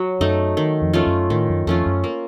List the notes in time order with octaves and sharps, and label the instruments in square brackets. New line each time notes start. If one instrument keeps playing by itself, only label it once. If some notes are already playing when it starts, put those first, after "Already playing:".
Already playing: [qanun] F#3
[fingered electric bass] F#2 [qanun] A3 D#4
[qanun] D#3
[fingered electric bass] F2
[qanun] A3 C#4 F4
[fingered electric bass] F#2
[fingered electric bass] A2 [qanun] D#3
[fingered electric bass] F#2
[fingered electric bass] F2 [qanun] A3 C#4 F4
[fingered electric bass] F#2
[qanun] A#3